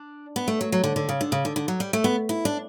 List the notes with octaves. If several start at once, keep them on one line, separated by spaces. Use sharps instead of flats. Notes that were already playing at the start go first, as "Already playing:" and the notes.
Already playing: D4
B3
A3
F#3
F#3
D3
D3
C#3
D3
C#3
D3
D3
F#3
G3
A3
B3
E4
D4